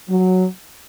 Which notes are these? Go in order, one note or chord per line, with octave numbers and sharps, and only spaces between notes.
F#3